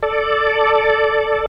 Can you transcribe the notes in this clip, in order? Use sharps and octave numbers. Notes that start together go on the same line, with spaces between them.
A4 D5